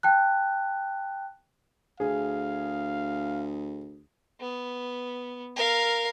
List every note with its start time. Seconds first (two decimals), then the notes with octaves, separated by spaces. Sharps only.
0.03 G5 A5 F#6
2.00 D2 G#4 F5
4.40 B3
5.56 A#4 F5